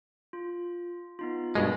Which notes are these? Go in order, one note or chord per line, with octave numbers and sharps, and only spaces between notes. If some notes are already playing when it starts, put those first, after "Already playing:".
F4
B3 D#4 F4
G2 B2 G#3 A#4